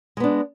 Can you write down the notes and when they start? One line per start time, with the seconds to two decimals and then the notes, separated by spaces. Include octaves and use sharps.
0.17 G#3
0.20 B3
0.24 D4